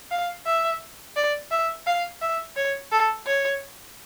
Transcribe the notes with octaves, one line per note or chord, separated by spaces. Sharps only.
F5
E5
D5
E5
F5
E5
C#5
A4
C#5